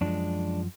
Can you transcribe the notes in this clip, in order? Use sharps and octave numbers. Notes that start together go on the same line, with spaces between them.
F#2 F3 G#3 D4